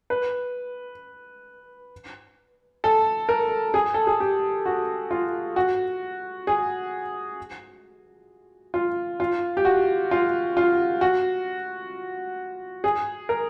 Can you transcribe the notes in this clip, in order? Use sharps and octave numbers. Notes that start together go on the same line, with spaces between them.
B4
A4
A#4
G#4
A4
G#4
G4
F#4
F4
F#4
G#4
F4
F4
G4
F#4
F4
F4
F#4
G#4
A#4